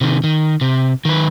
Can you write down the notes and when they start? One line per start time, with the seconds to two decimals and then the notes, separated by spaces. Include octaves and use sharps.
0.01 C3 D#3
0.24 D#3
0.61 C3
1.05 D#3 B4